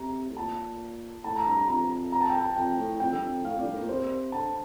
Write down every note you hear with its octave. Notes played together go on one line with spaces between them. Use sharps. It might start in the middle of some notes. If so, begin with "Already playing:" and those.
Already playing: C3 A#5
A2
A#2 A5
A2 A5
A#5
G2 A#5
A#5
F2 A#5
A#5
A5
G5
A5
F2 G5
A2
F2 G5
G2
F2
A2 F5
F2
G2 D5
A2 A#4
A#2
C3 C5
D3 A5